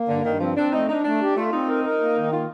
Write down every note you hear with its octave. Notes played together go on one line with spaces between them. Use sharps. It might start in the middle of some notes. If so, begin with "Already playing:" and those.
Already playing: A#3
G2 D3
G2 D#3
F3 C4
C4 D4
A3 D#4
D4 D#4
A3 D4
G4
A3 F4
C4 D#4
A#4
A#4
A#3
D#3
A#3 F4